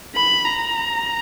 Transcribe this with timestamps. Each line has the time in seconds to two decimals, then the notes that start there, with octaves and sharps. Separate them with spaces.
0.15 B5
0.44 A#5